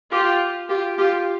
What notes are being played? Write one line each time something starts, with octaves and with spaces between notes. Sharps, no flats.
F4 G4
F4 G4
F4 G4